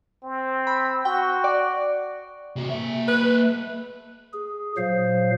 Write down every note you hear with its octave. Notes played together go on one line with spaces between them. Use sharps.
C4
B5
F#4 G5
D5
C3 F#4
A#3 E5
B4
G#4
A#2 F#3 C5 F5